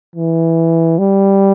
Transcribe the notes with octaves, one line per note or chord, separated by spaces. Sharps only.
E3
G3